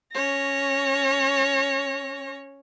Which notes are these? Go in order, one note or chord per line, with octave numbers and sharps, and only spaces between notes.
C#4 C#5 A#6